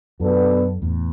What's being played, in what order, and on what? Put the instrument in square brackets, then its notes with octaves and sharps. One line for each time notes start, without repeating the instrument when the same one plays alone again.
[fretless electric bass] F#2 [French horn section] B2 B3 D4 F#4 A4
[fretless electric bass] E2 A2